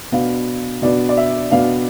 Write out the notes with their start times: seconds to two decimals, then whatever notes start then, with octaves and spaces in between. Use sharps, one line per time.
0.12 B2 B3 D4 F5
0.82 B2 B3 D4 D5
1.09 D5
1.17 E5
1.51 B2 B3 D4 F5